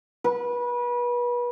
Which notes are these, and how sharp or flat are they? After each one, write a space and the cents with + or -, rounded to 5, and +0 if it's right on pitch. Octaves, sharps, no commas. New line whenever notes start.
B4 -30